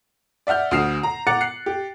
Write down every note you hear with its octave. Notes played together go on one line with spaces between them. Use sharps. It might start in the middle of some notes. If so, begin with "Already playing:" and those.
D5 E5 F#5 F6 G6
D2 F#4 D#6 F6 C7 E7
A#5
F#5 A#5 D6 F#6 A6 C#7
F#6 C7 C#7
G4